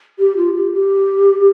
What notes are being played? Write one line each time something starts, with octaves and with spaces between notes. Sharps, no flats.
G4
F4
G4
G4